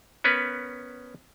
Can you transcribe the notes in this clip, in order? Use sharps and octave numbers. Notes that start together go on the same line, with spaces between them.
B3 C#4 A#4 B4